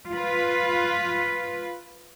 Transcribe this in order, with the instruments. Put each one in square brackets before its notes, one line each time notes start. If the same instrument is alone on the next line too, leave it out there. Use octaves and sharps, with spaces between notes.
[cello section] F4 B4